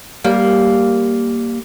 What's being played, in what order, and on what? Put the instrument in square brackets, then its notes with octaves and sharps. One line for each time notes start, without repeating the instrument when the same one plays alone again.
[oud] G3 A#3